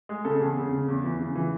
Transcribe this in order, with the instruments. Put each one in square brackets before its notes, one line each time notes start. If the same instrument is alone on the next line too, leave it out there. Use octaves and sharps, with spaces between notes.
[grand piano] G#3 G#4
C#3 A4
E2 G#4
C#3
C#3
E2
E3
C#3
E3